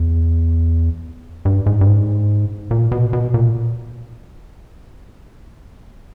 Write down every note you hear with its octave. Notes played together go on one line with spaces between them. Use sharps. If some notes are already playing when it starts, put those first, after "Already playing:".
Already playing: E2
G2
G#2
G2
G#2
A#2
B2
B2
A#2